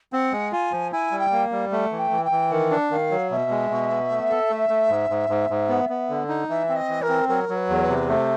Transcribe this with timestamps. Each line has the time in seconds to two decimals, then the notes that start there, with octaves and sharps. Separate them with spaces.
0.12 C4 F#5
0.32 G#3
0.52 F4 G#5
0.72 F3
0.92 E4 G#5
1.11 G3
1.19 G5
1.32 A#3
1.52 G3
1.72 A3 F#5
1.92 E3
1.98 G5
2.11 E3
2.24 G5
2.31 E3
2.51 D#3 F#5
2.71 D4
2.91 D#3 F5
3.11 F#3
3.31 B2 E5
3.51 G#3
3.70 B2
3.91 B3
4.10 A3
4.30 A4
4.50 A3
4.69 A3
4.89 G#2
5.10 G#2
5.29 G#2
5.50 G#2
5.69 B3
5.89 B3
6.09 D3
6.29 D#4
6.49 E3 E5
6.69 C4
6.75 D#5
6.89 E3
7.02 A#4
7.09 C4
7.28 F#3 A#4
7.49 F#3
7.55 B4
7.69 E2
7.76 A#4
7.82 B4
7.88 C3
8.08 A3 C5